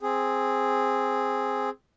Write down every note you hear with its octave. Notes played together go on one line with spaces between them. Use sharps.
C4 G#4